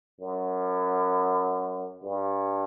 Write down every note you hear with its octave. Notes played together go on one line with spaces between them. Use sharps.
F#2
G2